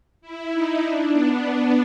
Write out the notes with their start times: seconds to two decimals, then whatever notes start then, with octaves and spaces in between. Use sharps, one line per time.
0.21 E4
0.52 D#4
0.83 D4
1.12 B3